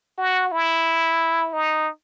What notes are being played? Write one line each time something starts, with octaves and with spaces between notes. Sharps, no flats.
F#4
E4
D#4